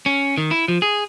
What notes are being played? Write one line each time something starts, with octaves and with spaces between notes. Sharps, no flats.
C#4
D#3
E4
F3
G#4